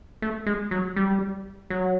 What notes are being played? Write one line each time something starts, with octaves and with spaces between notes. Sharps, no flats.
A3
G#3
F#3
G3
F#3